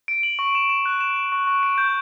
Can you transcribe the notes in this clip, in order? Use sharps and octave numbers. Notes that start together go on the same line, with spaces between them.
D7
F#7
C#6
E7
E7
F#6
E7
E7
C#6
C#6
D7
G6